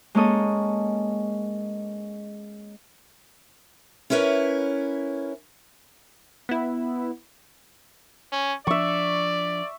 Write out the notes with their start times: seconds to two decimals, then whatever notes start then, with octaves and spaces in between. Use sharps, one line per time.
0.15 G#3 A#3 C#4 A4 D#5 D#6
4.10 C#4 E4 A#4 B4 C#5
6.49 B3 E4
8.32 C#4
8.67 F3 D4 D5 E5 C#6